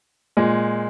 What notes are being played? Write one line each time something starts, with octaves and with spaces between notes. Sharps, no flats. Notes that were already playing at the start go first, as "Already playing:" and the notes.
A#2 G#3